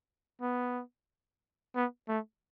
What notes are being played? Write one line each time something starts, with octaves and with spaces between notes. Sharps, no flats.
B3
B3
A3